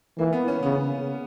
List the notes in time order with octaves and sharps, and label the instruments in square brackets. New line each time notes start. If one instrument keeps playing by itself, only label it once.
[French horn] E3 [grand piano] A#3
[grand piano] B3
C#4
[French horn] C#3 [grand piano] B3